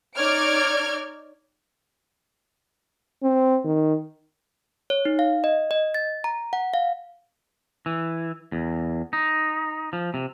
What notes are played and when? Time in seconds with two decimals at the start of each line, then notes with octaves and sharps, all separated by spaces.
0.15 D#4 C#5 D5 F6 G#6 D7
3.23 C4
3.65 D#3
4.90 C#5
5.05 D#4
5.19 F5
5.44 D#5
5.71 D#5
5.94 A6
6.24 A#5
6.53 F#5
6.74 F5
7.86 E3
8.52 E2
9.13 D#4
9.93 F3
10.14 C3